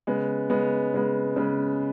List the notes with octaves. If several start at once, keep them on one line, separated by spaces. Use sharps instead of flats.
C#3 G#3 B3
C#3 G#3 B3
C#3 G#3 B3
C#3 G#3 B3